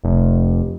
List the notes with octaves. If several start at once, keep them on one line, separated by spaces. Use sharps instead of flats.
F1